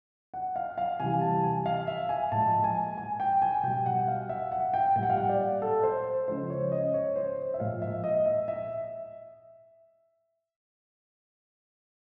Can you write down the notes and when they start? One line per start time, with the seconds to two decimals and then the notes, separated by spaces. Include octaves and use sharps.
0.34 F#5
0.56 F5
0.78 F5
1.00 C3 E3 G3 G#5
1.21 A5
1.44 G#5
1.66 F5
1.87 E5
2.09 G#5
2.32 A#2 F3 G#3 A5
2.64 G#5
2.98 G#5
3.20 G5
3.42 G#5
3.63 B2 G3 G5
3.86 F#5
4.08 F5
4.29 E5
4.52 F#5
4.74 G5
4.95 A#2 G5
4.99 G3 F#5
5.10 F5
5.17 F#5
5.29 D5
5.62 A4
5.83 C5
6.28 C#3 F3 G#3 C5
6.50 C#5
6.72 D#5
6.94 C#5
7.16 C5
7.54 E5
7.60 A#2 F3 G#3 F5
7.82 E5
8.04 D#5
8.26 E5
8.48 E5